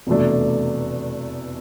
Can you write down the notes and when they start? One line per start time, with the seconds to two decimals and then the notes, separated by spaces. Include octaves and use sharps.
0.07 F1 E2 B2 A3 D4